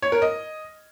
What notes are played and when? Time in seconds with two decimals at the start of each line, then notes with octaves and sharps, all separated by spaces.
0.02 C#5
0.12 A#4
0.22 D#5